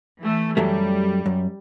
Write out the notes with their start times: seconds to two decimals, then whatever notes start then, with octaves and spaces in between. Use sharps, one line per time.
0.19 E3 A3
0.57 F#2 F#3 G3 A3
1.26 F#2